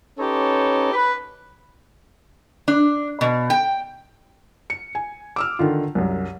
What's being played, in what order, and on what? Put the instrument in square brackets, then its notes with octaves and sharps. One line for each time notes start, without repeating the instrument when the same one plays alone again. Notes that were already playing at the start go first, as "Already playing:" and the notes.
[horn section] C#4 D#4 G4 A4 B4 C#5
B4 B5
[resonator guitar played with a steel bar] D4
B2
G5
[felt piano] C#7
G#5
D6 E6 F6
D3 D#3 F4
C2 F#2